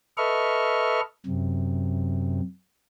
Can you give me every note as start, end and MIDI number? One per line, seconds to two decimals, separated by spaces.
0.17 1.01 69
0.17 1.01 71
0.17 1.01 75
0.17 1.01 76
0.17 1.01 85
0.17 1.01 89
1.26 2.41 42
1.26 2.41 48